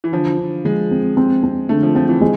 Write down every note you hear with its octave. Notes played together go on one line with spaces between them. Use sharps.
E3
D3 F3
D3
F3 G#3
C4
C4
C4
D3 A3
F3
F3 C4
E3
G#3